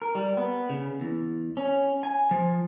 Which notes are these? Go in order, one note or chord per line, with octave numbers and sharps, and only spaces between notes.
A#4
G3
B3
C#3
E2
C#4
G#5
F3